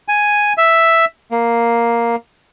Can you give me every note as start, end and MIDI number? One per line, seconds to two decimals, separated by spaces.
0.08 0.53 80
0.58 1.05 76
1.31 2.16 58